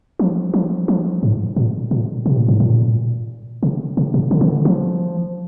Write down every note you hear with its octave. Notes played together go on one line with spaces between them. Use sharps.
F3
F3
F3
G#2
A#2
A#2
C3
A#2
G#2
A#2
C3
C3
A#2
D3
D#3
D3
F3